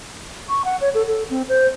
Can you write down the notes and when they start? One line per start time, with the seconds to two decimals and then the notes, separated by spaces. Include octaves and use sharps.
0.49 C#6
0.65 F#5
0.81 C#5
0.94 A4
1.07 A4
1.30 C4
1.49 C5